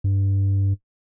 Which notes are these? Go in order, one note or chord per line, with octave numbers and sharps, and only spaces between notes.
G2